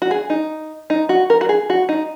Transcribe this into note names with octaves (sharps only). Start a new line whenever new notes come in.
F#4
G#4
D#4
D#4
F#4
A#4
F#4
G#4
F#4
D#4